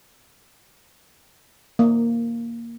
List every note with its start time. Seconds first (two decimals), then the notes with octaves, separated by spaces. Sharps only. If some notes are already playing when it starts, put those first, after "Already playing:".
1.79 A#3